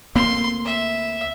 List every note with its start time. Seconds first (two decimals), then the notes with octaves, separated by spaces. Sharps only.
0.15 D2 A#3 C4 C6
0.65 E5